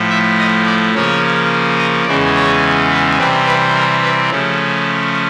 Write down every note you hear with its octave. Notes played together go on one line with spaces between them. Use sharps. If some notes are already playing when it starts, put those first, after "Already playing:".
Already playing: A2 F3 A3
E5
D#5
D5
C#3 F3 A#3 C#4 C#5
D#5
E2 C#3 E3 G#3 C#4 D5
C#5
B4
C3 E3 G3 C4 B4
B4
A#4
B4
C#3 F3 A3 C#4